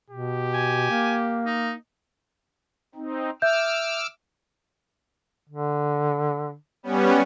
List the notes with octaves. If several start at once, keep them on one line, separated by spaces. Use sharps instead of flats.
B2 G4
G#5
A#3
D#4
C4 D#4
E5 D6 E6 F6 G6
D3
G3 B3 C#4